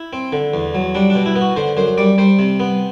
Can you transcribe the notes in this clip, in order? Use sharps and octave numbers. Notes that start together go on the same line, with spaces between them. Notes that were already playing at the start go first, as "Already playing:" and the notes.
Already playing: E4
C4
D3
E2
F#3
G3 D4
D4
B2
E4
B3
F#4
D3 C5
F#2 C5
G3 D5
G3 C5
C3
B3